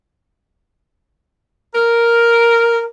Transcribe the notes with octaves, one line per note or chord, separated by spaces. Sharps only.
A#4